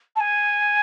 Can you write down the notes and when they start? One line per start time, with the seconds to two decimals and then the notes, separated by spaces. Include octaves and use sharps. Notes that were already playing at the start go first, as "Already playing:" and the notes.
0.16 A5
0.20 G#5